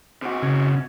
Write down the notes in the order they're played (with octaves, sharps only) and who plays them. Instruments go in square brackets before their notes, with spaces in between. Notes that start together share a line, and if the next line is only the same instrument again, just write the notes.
[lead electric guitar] C3 F#4
[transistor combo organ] C#3